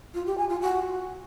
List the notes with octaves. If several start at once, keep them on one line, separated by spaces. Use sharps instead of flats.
F4
G4
G#5
F4
F#4